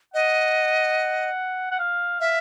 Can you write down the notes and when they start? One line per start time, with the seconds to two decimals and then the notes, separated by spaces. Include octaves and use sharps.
0.14 D#5 F#5
1.71 F#5
1.79 F5
2.20 E5 F5